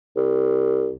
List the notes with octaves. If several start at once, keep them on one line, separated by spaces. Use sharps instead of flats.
C2